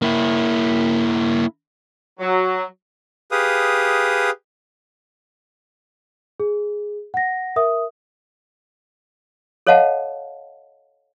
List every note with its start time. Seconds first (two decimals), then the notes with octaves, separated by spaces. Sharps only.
0.02 A#3 E4
2.20 F#3
3.31 G4 G#4 B4 F5 D#6
6.40 G#4
7.14 F#5 A#6
7.56 A#4 E5 D#6
9.67 A4 C#5 D#5 F5 F#5 A5